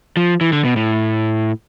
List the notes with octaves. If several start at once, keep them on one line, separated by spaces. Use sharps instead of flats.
F3
E3
D3
B2
A2